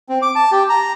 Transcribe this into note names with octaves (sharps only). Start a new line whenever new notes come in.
C4
D6
A5
G4
A#5